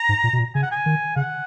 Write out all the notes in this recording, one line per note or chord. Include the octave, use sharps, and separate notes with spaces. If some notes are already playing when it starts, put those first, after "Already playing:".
Already playing: A#5
G#2
A#2
B2
A#2
C#3 G#5
F#5
G#5
D#3
C#3 F#5